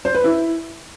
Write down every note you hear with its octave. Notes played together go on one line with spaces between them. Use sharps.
C5
B4
E4